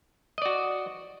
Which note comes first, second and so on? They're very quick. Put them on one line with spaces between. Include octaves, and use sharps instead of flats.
D#5 D5 F#4